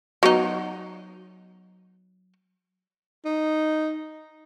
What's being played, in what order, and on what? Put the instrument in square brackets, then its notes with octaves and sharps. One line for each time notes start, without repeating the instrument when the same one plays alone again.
[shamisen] F#3 B3 D#4
[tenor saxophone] D#4